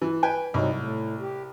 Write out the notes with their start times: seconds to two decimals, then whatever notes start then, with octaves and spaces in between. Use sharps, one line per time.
0.02 E3
0.23 B4 G5 G#5
0.54 C2 F#3 D#4
0.75 A2
1.20 G4